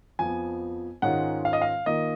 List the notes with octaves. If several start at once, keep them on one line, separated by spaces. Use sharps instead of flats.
F2 F3 B3 G#5
G#2 D#3 G#3 C#4 F4 F#5
F5
D#5
F5
D#3 A#3 F4 D#5